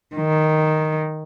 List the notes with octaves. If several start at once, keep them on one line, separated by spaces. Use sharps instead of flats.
D#3